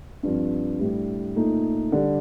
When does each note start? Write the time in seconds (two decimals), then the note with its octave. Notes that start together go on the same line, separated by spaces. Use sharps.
0.23 G2 F3 C4
0.80 A2 G3 D4
1.36 A#2 A3 D#4
1.92 D3 G3 D4